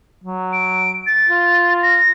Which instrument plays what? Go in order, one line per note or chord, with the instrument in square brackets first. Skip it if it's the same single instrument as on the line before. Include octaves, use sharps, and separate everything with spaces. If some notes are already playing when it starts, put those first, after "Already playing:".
[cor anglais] F#3
[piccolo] D7
A6
[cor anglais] F4
[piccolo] A#6